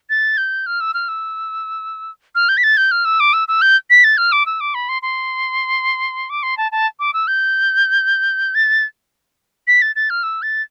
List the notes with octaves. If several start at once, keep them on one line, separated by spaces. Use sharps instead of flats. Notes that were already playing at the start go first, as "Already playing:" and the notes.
A6
G6
F6
E6
F6
E6
F6
G6
B6
A6
G6
F6
E6
D6
E6
E6
G6
B6
A6
F6
D6
E6
D6
B5
C6
C6
D6
C6
A5
A5
D6
E6
G6
A6
B6
A6
A6
F6
E6
A6